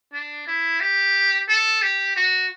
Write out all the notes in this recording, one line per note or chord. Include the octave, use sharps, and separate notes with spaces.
D4
E4
G4
A4
G4
F#4